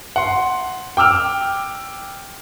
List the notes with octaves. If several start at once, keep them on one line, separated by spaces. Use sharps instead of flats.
F#5 C6
G5 D6 E6 F6